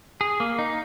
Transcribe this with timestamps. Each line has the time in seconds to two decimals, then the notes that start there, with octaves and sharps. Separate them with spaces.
0.21 G#4
0.40 A#3
0.59 D#4